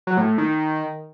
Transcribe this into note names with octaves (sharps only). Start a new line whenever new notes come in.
F#3
A2
A2
D#3
D#3